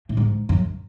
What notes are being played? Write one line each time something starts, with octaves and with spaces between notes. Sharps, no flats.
A2
G#2
F#2